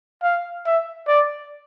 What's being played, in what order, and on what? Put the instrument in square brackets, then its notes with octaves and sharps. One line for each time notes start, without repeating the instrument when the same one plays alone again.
[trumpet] F5
E5
D5